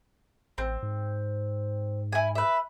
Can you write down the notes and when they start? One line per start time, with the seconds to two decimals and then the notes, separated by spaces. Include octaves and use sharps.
0.58 A1 C4
0.82 G#2
2.12 E4 G#5
2.35 B4 E5